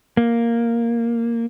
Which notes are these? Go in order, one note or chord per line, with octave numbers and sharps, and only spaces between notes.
A#3